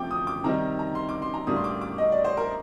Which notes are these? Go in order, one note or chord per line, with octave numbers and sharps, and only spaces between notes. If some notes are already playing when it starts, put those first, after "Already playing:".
Already playing: C3 F3 A3 G5 D6
D#6
D6
C3 D#3 G3 C4 D#4 A#5
A#5
C6
D6
C6
A#5
A2 G3 A#3 D4 D#6
C6
D6
D6
D#5
D5
C5
A#4